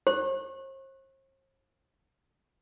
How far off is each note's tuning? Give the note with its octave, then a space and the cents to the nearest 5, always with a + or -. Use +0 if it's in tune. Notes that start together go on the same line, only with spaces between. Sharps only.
C5 +45 C#6 -35